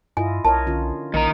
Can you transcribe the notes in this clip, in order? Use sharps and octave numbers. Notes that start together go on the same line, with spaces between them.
G2 E4 F4 D#5 G#5
B1 A#4 C#5 D#5 A5
D3 C#4 F4
A#1 D#3 A#3 A#5